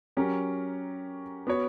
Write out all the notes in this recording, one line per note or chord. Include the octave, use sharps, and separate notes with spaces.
F#3 C#4 G4 A#4
B3 F#4 C#5